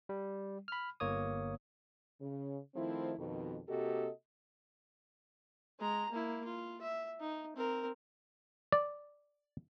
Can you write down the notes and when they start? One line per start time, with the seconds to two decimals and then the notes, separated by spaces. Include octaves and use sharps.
0.09 G3
0.68 B5 F6
1.00 G1 A#3 C#5 D#6
2.20 C#3
2.75 D#3 F3 A3 C4 E4
3.18 F2 B2 D#3
3.68 C3 A#3 F#4 G4 A4 D#5
5.80 G#3 A#5
6.11 A#3 E4
6.45 F4
6.81 E5
7.20 D#4
7.56 C4 A#4
8.72 D5